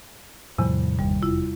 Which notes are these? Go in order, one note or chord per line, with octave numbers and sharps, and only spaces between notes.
E2 A2 C3 F3 G3
G1 D#2 G3
F1 E4 F4